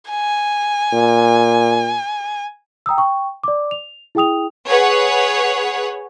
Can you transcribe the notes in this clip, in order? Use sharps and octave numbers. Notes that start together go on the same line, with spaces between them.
G#5
A#2
G5 A#5 D#6 E6
G5 C#6
D5 D6
F7
E4 G#4 G5 D#6 F7
G#4 B4 C#5 F#5